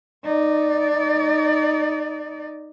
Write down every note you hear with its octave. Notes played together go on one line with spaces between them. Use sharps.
D#4 D5